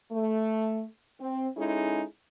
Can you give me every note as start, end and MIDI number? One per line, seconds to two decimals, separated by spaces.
0.12 0.84 57
1.20 1.47 60
1.57 2.03 56
1.57 2.03 61
1.57 2.03 63
1.57 2.03 64
1.57 2.03 68
1.57 2.03 69